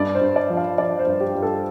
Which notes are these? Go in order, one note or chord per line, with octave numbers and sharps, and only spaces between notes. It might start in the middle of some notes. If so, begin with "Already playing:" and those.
Already playing: G2 D5
C5
G2
D5
F3
F5
F3 D5
C5
G2
G4
G2
A4